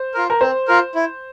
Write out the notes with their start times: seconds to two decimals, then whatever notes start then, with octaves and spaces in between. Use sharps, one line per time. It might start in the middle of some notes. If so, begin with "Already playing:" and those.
Already playing: C5
0.14 F4 A#4
0.30 A#4
0.41 C4 C5
0.68 F4 A#4
0.95 E4